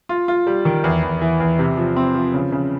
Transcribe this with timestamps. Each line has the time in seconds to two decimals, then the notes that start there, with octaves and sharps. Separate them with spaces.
0.09 F4
0.28 F4
0.47 G3
0.65 D#3
0.84 E2
1.03 E2
1.21 E3
1.40 E2
1.59 C3
1.77 F3
1.96 C4
2.15 F3
2.34 C#3
2.52 C#3